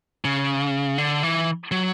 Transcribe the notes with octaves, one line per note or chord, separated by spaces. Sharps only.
C#3
D3
E3
F#3